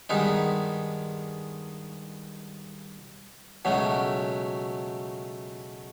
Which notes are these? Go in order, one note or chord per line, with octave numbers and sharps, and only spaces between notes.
G2 D#3 G#3 B3 D#4
C#2 B2 F#3 A3